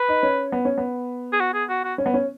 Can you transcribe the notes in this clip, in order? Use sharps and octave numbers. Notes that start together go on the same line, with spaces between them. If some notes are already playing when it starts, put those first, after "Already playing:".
Already playing: B4
D#4
C#4
B3
C#4
B3
G#4
F#4
G#4
F#4
F#4
C#4
B3
C#4